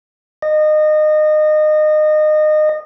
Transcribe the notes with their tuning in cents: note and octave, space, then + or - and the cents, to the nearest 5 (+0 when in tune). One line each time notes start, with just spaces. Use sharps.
D#5 -25